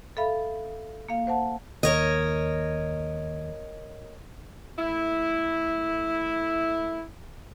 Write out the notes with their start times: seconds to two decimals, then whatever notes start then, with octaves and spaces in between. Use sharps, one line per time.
0.17 A4 E5 F5 B5
1.09 A#3 F5
1.27 C5 F#5 A5
1.83 D#2 A#4 C#5 D#5
4.79 A3 E4